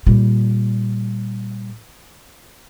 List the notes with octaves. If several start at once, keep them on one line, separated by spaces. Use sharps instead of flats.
A#2 G3